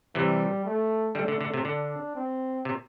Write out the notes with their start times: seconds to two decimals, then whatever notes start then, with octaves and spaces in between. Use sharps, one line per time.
0.15 C3 E3 G3
0.65 A3
1.15 D3 G3 A3
1.28 D3
1.41 D3
1.54 C3
1.65 D3 D4
2.15 C4
2.65 C3